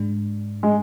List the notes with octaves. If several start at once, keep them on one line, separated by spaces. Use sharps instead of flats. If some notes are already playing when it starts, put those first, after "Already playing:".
Already playing: G#2 G#3 D4
G#3